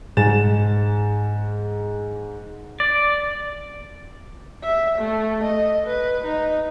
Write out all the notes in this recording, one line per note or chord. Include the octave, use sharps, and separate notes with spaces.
G#2 G#5 A6 E7
D5
E5
A3
D#5
B4
D#4